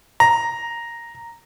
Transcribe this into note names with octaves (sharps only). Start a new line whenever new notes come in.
A#5